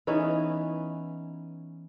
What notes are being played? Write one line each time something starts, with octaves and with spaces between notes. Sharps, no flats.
E3 B3 C#4 D#4